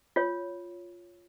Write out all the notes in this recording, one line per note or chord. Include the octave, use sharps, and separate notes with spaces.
F4 C#5